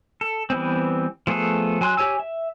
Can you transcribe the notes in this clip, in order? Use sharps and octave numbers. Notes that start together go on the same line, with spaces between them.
A4
E3 G3 B3 C4
F3 A3 B3 G#4 A4
F#3 G#5 C6 F#6
G4 C#5 G#5 E6
E5